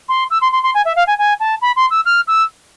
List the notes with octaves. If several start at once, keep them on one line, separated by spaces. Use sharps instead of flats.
C6
E6
C6
C6
C6
G#5
E5
F5
G#5
G#5
A5
B5
C6
E6
F6
E6